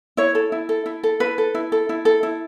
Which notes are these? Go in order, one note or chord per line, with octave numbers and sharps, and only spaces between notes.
E4 C#5
A4
E4
A4
E4
A4
E4 B4
A4
E4
A4
E4
A4
E4